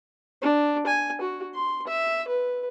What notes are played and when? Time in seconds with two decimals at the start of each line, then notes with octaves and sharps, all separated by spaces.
0.42 D4
0.87 G#5
1.21 F#4
1.55 C6
1.87 E5
2.28 B4